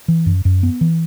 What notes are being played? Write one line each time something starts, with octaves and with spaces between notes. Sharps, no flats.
E3
F#2
F#2
B3
E3